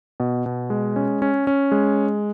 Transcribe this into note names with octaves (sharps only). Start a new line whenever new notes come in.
B2
B2
G#3
C#4
C#4
C#4
G#3